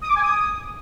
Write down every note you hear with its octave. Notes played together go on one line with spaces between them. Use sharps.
D#6
D6
G#5
D#6